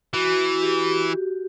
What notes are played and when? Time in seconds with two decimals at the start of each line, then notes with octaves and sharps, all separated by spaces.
0.14 E3 F#4
0.62 G4